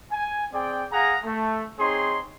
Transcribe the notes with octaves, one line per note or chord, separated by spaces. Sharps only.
G#5
C4 G#4 D5 G5
G#4 F5 F#5 A#5
A3
C4 D#4 G#4 C5 C#5 C6